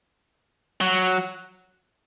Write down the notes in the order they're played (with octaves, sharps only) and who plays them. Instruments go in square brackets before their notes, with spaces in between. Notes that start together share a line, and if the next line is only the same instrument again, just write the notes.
[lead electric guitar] F#3